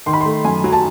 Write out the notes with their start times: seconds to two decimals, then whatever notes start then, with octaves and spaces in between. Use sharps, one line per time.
0.06 D#3 C6
0.13 B5
0.21 A3 C6
0.45 F#2 G#5
0.64 F#3
0.73 A5